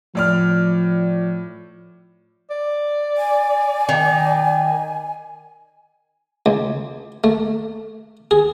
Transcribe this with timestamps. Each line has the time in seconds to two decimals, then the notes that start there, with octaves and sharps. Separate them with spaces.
0.15 A2 F3 D5 F6
2.50 D5
3.17 G#5
3.89 D#3
6.46 C#2
7.24 A3
8.31 G#4